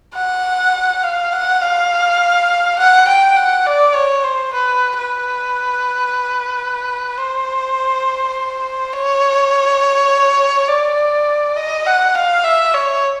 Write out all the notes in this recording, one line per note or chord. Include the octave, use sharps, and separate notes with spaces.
F#5
F5
F#5
F5
F#5
G5
F#5
D5
C#5
C5
B4
B4
C5
C#5
D5
D#5
F#5
F5
E5
C#5